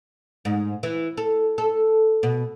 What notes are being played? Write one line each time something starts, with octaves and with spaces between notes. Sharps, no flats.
G#2
E3
A4
A4
B2